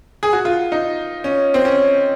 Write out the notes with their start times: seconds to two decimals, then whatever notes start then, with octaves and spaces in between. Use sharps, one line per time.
0.23 G#4
0.33 F#4
0.45 F4
0.72 D#4
1.24 C#4
1.54 C4
1.65 C#4